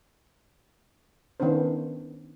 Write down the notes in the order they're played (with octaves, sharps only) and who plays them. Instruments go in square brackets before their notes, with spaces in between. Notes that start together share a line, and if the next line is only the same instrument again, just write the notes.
[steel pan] D#3 B3 C#4 D4 C5